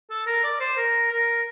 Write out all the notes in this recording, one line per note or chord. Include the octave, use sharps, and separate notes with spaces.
A4
A#4
D5
C5
A#4
A#4